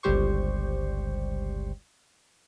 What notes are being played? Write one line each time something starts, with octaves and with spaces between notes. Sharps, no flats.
G1 C#2 G3 G4 C5 C#6